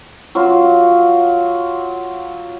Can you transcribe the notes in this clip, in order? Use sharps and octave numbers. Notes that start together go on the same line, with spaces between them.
F#3 F4